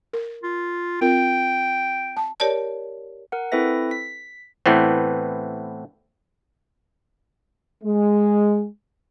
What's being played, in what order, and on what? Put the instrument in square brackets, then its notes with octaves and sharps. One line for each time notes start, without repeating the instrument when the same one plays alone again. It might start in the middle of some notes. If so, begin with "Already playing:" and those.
[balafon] A#4
[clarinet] F4
[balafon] C4 F4 A#4 [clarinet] G5
[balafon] A5
[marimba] G4 A#4 C#5 D5 A5
[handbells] A#4 F#5
C4 E4 A4 B4 E5 A#6
B6
[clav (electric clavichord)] A2 E3 B3 C4
[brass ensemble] G#3